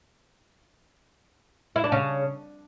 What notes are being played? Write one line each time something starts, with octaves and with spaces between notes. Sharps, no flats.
E4
D4
C#3